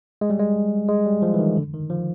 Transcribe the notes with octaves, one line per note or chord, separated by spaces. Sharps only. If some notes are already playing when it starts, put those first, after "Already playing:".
G#3
G3
G#3
G#3
G3
F3
E3
D#3
D3
D#3
F3